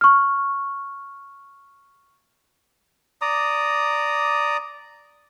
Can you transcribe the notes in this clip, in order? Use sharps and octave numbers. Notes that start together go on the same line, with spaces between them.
C#6 F6
D5 A#5 D#6